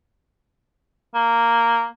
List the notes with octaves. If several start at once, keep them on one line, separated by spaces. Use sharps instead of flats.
A#3